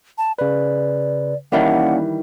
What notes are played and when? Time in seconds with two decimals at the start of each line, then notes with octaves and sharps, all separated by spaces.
0.18 A5
0.39 C#3 B4 D5
1.52 D#3 E3 G3 A#3 C#4 D5 F#5